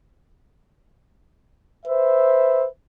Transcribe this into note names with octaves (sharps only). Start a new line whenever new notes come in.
B4 C5 E5